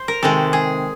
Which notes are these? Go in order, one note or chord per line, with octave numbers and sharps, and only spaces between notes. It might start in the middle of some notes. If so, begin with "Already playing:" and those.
Already playing: C5
A#4
C3 D#3 G#3 A4
G#4